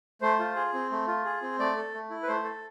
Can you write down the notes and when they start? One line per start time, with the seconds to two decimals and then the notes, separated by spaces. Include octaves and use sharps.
0.22 A3 C5
0.39 F4
0.56 G#4
0.74 C4
0.91 A3
1.07 F4
1.25 G#4
1.42 C4
1.59 A3 D5
1.77 A4
1.94 A3
2.10 E4
2.23 B4
2.27 A3 C5
2.44 A4